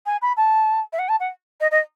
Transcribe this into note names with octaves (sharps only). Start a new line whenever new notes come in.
G#5
B5
A5
E5
F#5
A5
F#5
D#5
D#5